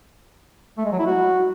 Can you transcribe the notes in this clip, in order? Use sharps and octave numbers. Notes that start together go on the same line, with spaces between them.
A3
G#3
F#3
E4
F#4